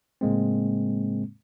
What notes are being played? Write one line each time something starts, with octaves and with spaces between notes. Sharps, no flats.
A2 C#3 G#3 A#3 C4